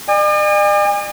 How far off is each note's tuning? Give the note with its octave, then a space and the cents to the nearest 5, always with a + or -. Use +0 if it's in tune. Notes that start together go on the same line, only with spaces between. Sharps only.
D5 +45 G#5 -40